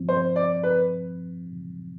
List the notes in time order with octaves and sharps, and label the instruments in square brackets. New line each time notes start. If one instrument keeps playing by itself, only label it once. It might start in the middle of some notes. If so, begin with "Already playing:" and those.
Already playing: [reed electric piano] G2 F3 C4
[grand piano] C5
D5
B4